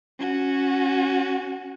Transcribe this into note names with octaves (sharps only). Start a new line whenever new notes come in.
C#4 F#4